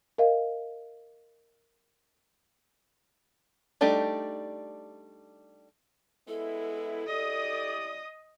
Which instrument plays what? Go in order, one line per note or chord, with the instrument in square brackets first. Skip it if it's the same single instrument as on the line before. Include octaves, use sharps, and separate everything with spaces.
[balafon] A#4 D#5 F5
[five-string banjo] G3 A3 D4 D#4 G4
[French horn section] G#3 B3 E4 [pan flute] A4
[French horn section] E4 G4 D5 [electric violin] D#5 D#6